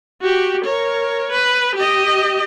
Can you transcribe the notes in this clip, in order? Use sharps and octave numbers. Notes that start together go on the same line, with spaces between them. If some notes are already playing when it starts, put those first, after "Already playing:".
F#4 G4
A#4 C#5
B4
G4 D#5